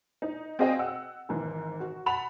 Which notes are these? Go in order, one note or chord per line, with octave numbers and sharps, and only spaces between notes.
D#4
C4 F#4 G#4 D#5 F5 G5
F#5 E6
G#1 G#2 E3
F#4
F#5 A5 B5 F7